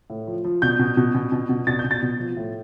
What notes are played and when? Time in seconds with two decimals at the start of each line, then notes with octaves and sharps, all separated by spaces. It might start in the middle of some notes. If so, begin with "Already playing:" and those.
0.10 A2
0.27 F3
0.45 F3
0.62 B2 G6
0.79 B2
0.97 B2
1.15 B2
1.32 B2
1.49 B2
1.67 B2 A6
1.79 G6
1.84 B2
1.91 A6
2.02 B2
2.20 F3
2.37 A2